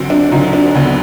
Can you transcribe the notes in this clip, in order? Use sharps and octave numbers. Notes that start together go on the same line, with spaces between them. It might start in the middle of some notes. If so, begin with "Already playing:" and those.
Already playing: D2 D3 F#3 C4
D4
D2 D3 F#3 D#4
D4
D2 D3 F#3 B3